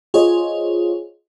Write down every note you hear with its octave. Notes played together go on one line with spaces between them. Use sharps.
F4 G#4 C5 C#5 D#5